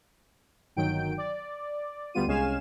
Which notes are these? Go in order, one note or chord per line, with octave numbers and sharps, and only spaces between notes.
G1 D#3 F#3 G5 D7
D5
D2 G3 B3 F4 D#7
C2 G#3 C#4 F5 G#5 E7